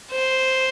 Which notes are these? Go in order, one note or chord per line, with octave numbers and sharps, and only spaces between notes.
C5